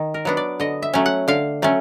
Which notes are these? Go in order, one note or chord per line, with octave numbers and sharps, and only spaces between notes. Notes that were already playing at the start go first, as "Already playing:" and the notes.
Already playing: D#3
A#4
F#3 B3 D4
D5
D3 D#5
E5
F#3 A3 C#4
F#5
D3 F5
F#3 A3 C#4